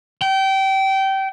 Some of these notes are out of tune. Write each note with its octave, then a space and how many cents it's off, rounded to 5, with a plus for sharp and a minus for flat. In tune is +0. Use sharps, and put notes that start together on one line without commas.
G5 -25